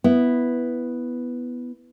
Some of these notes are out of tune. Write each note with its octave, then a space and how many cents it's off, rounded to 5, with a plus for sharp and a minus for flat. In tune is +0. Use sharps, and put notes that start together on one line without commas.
B3 +0 E4 +0